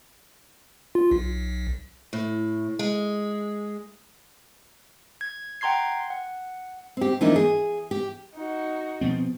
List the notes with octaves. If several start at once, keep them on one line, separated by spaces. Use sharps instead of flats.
F4
B1
A2
G#3
G#6
F#5 G5 A#5 C6 G#6 C7
F#5
C4 G4
E3 F3 A#3 D4 D#4
G#4
G4
D#4 F#4
B2 F3 C4